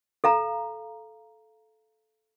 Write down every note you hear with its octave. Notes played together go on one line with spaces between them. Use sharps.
A4 F5 A#5